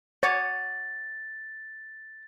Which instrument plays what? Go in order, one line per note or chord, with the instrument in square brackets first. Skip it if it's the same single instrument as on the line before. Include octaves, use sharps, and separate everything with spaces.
[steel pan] C#5 [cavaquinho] F#5 D6 D#6 [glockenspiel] A6